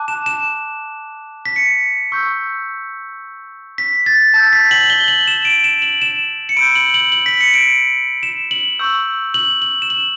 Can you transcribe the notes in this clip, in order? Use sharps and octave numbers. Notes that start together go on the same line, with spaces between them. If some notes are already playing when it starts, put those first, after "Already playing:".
Already playing: A5 D6 F#6
E7
E7
B6
C#7
C#6 E6 G6
B6
A6
A5 E6 G6 A6
B6
F#7
G7
F#7
E7
D7
E7
F#7
E7
C#7
B5 E6 G6 D7
F#7
F#7
F#7
B6
C#7
D7
E7
F#7
C#6 E6 G6
F#7
F#7
E7
F#7